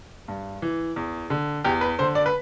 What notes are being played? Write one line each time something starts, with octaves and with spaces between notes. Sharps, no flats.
G2
E3
E2
D3
E2 G4
B4
D3 C5
D5
B4